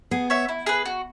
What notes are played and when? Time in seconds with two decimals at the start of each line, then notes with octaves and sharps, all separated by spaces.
0.11 B3 G#4
0.30 C#5 E5
0.49 E4
0.66 G#4 B4
0.85 F#4